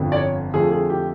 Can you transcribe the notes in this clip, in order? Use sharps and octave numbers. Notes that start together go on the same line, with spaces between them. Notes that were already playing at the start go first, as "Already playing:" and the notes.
Already playing: G1 F2 D3 F3
D5
C#5
F2 D3 F3 A3 G#4
G#4
G4